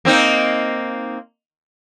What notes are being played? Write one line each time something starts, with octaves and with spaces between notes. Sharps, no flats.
A#3 C4 D#4